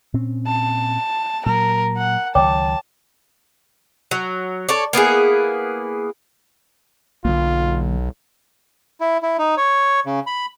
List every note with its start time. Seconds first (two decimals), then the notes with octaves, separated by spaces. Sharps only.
0.14 A#2 C4 C#4
0.47 A5
1.46 A#2 F#3 A#4
1.98 F#5
2.35 C#2 D#3 F#3 C#5 G5 A5 D6
4.11 F#3
4.69 A4 C#5 D5
4.93 A#3 B3 E4 G#4
7.25 B1 D3 F#3 A#3 F4
9.01 E4
9.23 E4
9.38 D#4
9.57 C#5
10.06 C#3
10.27 B5